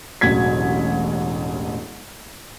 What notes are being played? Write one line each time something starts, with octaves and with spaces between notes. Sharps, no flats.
E1 A1 F#3 G#6 B6